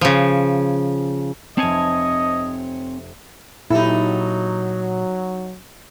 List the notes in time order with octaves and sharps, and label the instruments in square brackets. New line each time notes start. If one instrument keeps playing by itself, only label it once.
[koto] C#3 F3
[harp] F1 A5 [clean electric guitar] C4 C#5 G#5 [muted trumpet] D#5
[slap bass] A#2 [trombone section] F#3 [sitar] D#4 A4 [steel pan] E4 G4